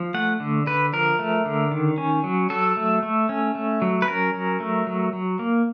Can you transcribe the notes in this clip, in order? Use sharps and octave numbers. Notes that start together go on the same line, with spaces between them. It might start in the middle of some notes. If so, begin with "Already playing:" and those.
Already playing: F3
A3 F#5
D3
D3 B4
F3 A#4
A3
D3
D#3
C#4
F#3
F#3 A4
A3
A3
C#4
A3
F#3
B4
C#4 A#4
F#3
A3
F#3
F#3
A#3